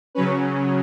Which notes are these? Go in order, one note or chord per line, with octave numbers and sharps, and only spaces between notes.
C#3 F#3 C#4 B4